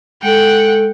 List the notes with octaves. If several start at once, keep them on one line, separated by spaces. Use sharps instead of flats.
G#3 A4 F#5 G5